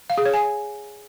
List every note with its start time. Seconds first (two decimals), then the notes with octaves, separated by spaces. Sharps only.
0.10 F5
0.18 G#4
0.26 C#5
0.34 G#5